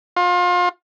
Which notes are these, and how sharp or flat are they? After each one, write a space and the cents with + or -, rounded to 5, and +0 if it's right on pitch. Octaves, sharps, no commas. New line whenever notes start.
F4 +30